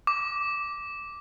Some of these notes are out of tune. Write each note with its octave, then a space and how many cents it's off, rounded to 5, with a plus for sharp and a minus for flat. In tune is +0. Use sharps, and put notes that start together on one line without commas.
D6 -5